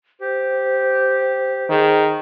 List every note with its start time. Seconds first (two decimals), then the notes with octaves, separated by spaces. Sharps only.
0.21 G4 C5
1.69 D#3 G#4